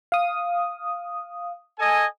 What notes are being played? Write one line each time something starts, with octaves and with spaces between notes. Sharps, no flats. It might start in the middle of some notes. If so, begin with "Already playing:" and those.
F5 D#6
A4 D#5 G#5